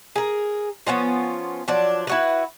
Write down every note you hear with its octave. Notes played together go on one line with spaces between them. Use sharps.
G#4 A#4
F3 B3 C#4 F4
F3 F#3 D4 D5
E4 F#4 B4